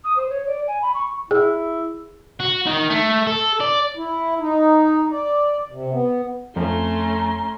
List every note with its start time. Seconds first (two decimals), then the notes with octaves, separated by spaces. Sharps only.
0.04 D#6
0.16 C5
0.30 C#5
0.46 D5
0.68 G#5
0.82 B5
0.94 C#6
1.31 E4 G#4
2.40 F#4
2.67 D#3
2.90 A3
3.27 A4
3.61 D5
3.97 E4
4.40 D#4
5.11 D5
5.71 C3
5.92 B3
6.56 F2 A3 C#4 A#5 C6